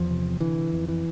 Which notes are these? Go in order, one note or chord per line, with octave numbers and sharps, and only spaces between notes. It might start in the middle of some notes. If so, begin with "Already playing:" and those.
Already playing: E2 F3
C3
D3 E3
F2
E3